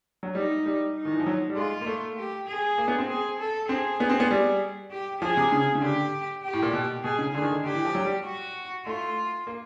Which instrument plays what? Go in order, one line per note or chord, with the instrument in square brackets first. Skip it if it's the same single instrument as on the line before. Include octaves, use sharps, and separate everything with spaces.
[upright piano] F#3
[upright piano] G3 [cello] D#4
[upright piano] G3
[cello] D#4
[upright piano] D#3
E3
F3
F#3
G3
[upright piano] G#3 [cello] F4
[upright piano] A#3
A3
[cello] G4
G#4
[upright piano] A#3
B3
C4
[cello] G#4
A4
[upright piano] C4 [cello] G#4
[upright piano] B3
C4
B3
G3
[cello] G4
[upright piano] F3 [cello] G#4
[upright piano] C3
C#3
C#3
[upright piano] D3 [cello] G4
[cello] G4
[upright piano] A2
A#2
B2
[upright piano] B2 [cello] G#4
[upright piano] C#3
[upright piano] D3 [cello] G#4
[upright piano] D#3
D3
[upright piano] D3 [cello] G4
[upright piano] E3
F3
F#3
G3
[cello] F#4
[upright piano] A3 [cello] F4
[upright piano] A#3